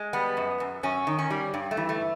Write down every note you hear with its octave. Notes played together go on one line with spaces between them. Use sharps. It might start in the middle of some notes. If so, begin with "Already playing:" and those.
Already playing: G#3
G3 B3
F#2
F#2
F#2 C#4
D#3
C#4
G3
G2
A3
E3
A3